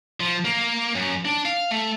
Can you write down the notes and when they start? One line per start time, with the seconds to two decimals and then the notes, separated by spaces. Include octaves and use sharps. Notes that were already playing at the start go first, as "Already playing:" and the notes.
0.20 F3
0.45 A#3
0.95 F#2
1.25 D4
1.45 F5
1.71 A3